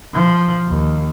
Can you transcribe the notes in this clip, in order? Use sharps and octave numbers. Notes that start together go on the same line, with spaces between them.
F3
D#2